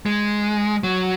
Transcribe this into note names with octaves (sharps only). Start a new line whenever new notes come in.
G#3
F#3